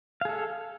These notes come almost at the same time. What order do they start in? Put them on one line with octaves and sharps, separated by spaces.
F5 G#4 A4